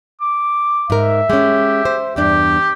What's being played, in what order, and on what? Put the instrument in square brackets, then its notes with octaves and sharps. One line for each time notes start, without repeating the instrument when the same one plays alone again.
[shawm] D6
[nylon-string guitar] G#2 A#4 [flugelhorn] E5
[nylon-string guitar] G#3 C#4 [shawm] G4
[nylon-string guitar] C5
[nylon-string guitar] E2 G2 D4 [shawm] G4